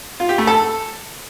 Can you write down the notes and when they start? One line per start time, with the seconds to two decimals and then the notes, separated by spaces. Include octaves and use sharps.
0.20 F4
0.29 G4
0.38 A3
0.47 A4